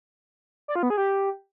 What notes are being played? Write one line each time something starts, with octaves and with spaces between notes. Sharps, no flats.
D5
F4
B3
G#4
G4